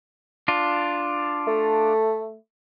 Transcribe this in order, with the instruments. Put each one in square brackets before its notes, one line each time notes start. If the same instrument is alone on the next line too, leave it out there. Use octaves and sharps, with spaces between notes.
[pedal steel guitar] D4 F4
[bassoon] A3